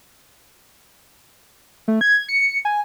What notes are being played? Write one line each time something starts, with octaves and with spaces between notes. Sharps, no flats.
A3
G#6
C#7
G#5